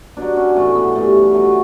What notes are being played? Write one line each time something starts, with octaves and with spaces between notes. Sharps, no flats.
B2 F#3 D4
C#4
A2 E3 A3
B3
G2 E3 A3
B2 F#3 A3